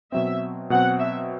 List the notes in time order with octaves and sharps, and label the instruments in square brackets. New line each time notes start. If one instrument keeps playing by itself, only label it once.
[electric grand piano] B2 F#3 C4 [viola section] E5
[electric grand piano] B2 F#3 C4 [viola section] F#5
[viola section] E5